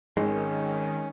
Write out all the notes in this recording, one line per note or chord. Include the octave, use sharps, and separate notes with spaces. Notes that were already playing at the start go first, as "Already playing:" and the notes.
G#1 D#3 G#3 C#4